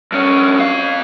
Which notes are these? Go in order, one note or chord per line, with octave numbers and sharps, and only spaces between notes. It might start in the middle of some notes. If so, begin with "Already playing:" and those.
G2 C#4
C4 F5